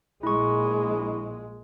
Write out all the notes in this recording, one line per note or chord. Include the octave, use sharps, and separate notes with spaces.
A#1 G#3 E4 C#6